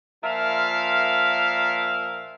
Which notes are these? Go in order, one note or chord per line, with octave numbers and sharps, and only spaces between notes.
A#2 F3 A#4 E5 F5